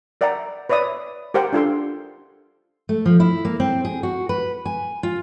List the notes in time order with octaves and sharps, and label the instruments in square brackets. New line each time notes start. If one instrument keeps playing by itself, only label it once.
[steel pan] A#4 D5 E5 F#5 G5 A#5
B4 C#5 D5 E5 D#6
G4 A#4 C5 F#5 G5
D4 F4 A4 C6
[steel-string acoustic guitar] A3
F3
E4
A#3
C4
G#4
F#4
B4
G#5
F4